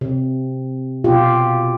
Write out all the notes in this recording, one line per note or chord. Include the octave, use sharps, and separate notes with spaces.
C3
B2 F4 G4